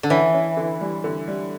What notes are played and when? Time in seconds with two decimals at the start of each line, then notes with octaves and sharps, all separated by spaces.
0.03 D3
0.10 E3 C#4
0.34 C#4
0.57 D3
0.81 G3
1.04 D3
1.28 G3